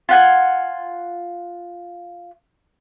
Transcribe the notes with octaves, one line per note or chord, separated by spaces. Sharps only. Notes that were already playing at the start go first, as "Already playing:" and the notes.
F4 F#5 G#5